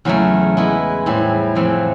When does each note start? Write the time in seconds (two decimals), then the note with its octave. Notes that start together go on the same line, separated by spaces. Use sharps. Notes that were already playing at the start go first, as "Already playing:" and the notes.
0.05 E2 C#3 F#3 A3
0.57 G#3 B3 E4
1.06 A2 E3 G3 C4
1.55 F2 C3 E3 A3 C4